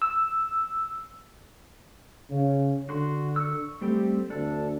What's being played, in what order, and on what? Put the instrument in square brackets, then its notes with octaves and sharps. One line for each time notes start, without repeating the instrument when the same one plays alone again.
[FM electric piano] E6
[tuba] C#3
[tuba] D3 [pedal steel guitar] F#4 C6
[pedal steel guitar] C#6 E6
[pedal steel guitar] G3 C4 G4 [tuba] A3
[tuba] D2 [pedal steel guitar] D4 A4